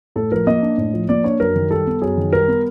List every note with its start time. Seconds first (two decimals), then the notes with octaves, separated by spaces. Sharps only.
0.16 A2 A4
0.32 F3 A#4
0.47 A#3 D#5
0.62 D4
0.78 A2
0.93 F3
1.09 A#3 D5
1.24 D4 C#5
1.40 F#2 A#4
1.55 D#3
1.71 G3 A4
1.86 B3
2.02 F#2 G#4
2.17 D#3
2.33 G3 A#4
2.48 B3